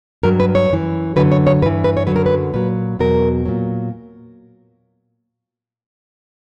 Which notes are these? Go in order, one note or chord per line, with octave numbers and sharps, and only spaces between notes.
G2 F#3 A#4
B4
C#5
F#2 E3
F#2 D3 F#3 B4
C#5
C#5
G2 E3 B4
B4
C#5
F#2 D3 F#3 B4
A#4
B4
A#2 F#3 B4
E2 B2 F#3 A#4
A#2 F#3